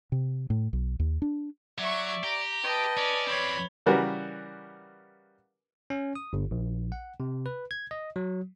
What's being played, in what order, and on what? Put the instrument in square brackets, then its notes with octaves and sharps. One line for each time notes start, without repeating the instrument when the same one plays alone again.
[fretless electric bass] C3
A2
B1
D#2
D4
[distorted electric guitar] F#3 [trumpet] D5 [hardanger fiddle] E5 C#6
[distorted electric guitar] G4 [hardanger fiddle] A#5
[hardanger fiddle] B4 [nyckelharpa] D#5 A5 [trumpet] G5
[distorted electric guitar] C#4 [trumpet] D5
[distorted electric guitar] F3 C4 [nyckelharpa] C#5 B5
[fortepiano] C#3 E3 G3 F#4 A#4 B4
[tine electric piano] C#4
D#6
G1
A#1
F#5
C3
B4
G#6
D#5
F#3